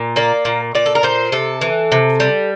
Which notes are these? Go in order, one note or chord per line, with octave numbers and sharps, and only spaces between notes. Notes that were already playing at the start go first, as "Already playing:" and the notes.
Already playing: A#2
A#3 D5
A#2
A#2 D5
A4
A#4
A#2 C5
C3 A4
E3
C3
G3